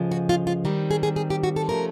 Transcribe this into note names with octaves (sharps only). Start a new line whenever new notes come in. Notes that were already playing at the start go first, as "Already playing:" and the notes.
Already playing: D2 C#3 F3 G#3
F#4
F4
F4
D#3 G3 C4
G#4
G#4
G#4
G4
F#4
A4
C3 F3 A3 C#4 A#4